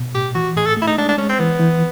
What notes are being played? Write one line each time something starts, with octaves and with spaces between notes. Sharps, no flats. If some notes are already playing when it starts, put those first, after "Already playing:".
Already playing: B2
A2 G4
E3 F#4
A2 G#4
A4
A3 E4
D#4
G#3 D4
D4
G#3 C#4
C4
E3 B3
E3